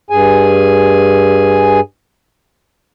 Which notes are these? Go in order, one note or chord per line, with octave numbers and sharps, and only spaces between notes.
G2 G#4 G#5